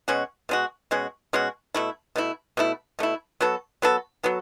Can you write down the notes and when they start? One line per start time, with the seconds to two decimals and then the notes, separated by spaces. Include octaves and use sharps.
0.08 B2 G#3 C#4 F#4
0.49 B2 G#3 C#4 F#4
0.91 B2 G#3 C#4 F#4
1.33 B2 G#3 C#4 F#4
1.74 B2 A3 E4
2.16 B2 A3 E4
2.57 B2 A3 E4
2.99 B2 A3 E4
3.41 F#3 B3 F#4 A4
3.82 F#3 B3 F#4 A4
4.23 F#3 B3 F#4 A4